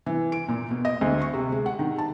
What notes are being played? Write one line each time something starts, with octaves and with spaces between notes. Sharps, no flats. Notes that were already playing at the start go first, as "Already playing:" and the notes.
E3
D7
A#2
B2
D#5
D2
C#6
C3
G#3
F#5
D#3
A5